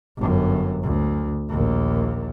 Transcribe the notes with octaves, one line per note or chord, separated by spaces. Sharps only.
G1 F#2
D2
A#1 D#2